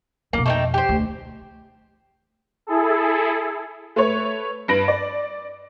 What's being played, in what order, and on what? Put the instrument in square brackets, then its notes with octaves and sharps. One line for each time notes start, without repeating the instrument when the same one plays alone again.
[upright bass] F2 B2 [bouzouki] A#3
[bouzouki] A3 D#4 G5
G4 C5
[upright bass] D2
[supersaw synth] E4 G#4 A4
[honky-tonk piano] A3 B4 C#5
G2 B4 A#6 D7 F#7
D5